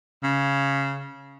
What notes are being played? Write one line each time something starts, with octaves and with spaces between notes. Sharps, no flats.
C#3